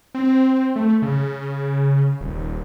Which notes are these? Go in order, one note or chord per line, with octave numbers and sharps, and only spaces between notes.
C4
A3
C#3
D#1